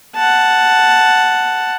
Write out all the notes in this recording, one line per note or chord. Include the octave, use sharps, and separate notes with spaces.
F#5 A5